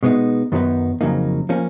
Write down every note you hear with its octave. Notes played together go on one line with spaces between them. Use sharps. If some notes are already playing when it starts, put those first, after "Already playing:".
B2 G#3 B3 D#4
F#2 D#3 F#3 B3 D#4
F2 C#3 F#3 A#3 D#4
F3 A#3 C#4